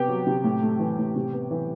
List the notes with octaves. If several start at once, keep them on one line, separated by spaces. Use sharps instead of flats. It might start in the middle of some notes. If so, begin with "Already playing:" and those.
Already playing: C3 B3 G4 G5
F#3
C3
A2
A3
E3
A2
C3
B3
E3